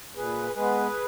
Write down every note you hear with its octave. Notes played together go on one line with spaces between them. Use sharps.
A#2 G#4 B4
G#3 B3 G#4 B4